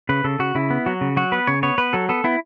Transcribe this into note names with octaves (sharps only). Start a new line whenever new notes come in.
C#3 B4
C#3 A4
C#3 F#4
C#3 E4
B3
F#3 F#4
C#3
F#3 F#4
B3 B4
C#3 C#5
B3 C#5
B3 B4
F#3 A4
B3 A4
B3 E4